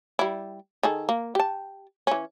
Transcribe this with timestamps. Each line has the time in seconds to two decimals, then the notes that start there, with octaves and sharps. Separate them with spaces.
0.19 G3 E4
0.83 D#3 G#4 A4
1.09 A#3
1.35 G4 A5
2.07 E3 C#4